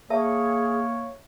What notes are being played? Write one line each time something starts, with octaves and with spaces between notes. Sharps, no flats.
A#3 G#4 C#5 E5 A5